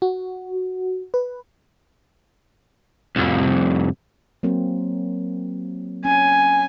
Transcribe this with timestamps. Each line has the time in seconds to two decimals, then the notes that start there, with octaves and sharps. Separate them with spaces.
0.02 F#4
1.14 B4
3.16 C2 F2
4.43 F#3 A#3 C4
6.05 C#4 G#5